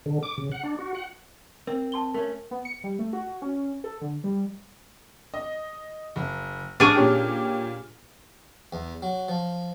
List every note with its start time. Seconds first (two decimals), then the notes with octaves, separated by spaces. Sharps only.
0.06 D3
0.23 D6
0.38 C#3
0.52 F#5
0.63 D4
0.78 F#4
0.95 F#5
1.67 C4 A#4
1.92 A5 C6 G7
2.14 A3 C#4 A#4
2.51 B3
2.65 C#7
2.84 G3
2.99 A3
3.13 F#4
3.42 C#4
3.84 A4
4.01 D3
4.24 G3
5.34 D#5
6.16 F#1
6.80 D4 G#4 C#6 F6
6.95 A#2 C#4 G4
8.73 E2
9.02 F#3
9.28 F3